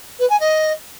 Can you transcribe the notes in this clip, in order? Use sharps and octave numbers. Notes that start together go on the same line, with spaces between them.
B4
G#5
D#5